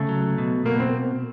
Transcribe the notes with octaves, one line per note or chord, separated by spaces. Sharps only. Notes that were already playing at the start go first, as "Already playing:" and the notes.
Already playing: C#3 A3
F#3
B2
B2 A#3
C4